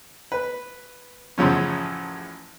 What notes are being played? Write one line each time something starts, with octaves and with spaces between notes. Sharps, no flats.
B4
A1 F#2 C#3 F3 C#4